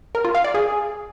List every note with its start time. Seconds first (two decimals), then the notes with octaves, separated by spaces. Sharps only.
0.15 A#4
0.25 F4
0.35 F5
0.44 D5
0.54 G#4